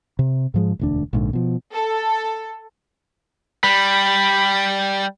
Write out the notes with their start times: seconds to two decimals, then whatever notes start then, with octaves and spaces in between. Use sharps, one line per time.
0.19 C3
0.54 G#2 F3 G#3
0.79 E1 D2 D4
1.13 A#1 G#2 D3
1.33 B2 F3
1.73 A4
3.64 G3 B5